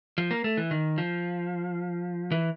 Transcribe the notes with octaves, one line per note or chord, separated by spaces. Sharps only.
F3
A#3
A3
E3
D#3
F3
E3